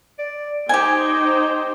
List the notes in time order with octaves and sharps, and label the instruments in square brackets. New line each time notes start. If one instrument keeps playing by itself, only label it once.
[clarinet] D5
[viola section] D#4 C5 G5 [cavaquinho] G4 G#5 [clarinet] D#5